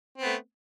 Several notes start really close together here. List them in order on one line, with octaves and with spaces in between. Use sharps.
C4 B3 A3